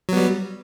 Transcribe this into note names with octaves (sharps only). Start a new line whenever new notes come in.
F#3 G3 B3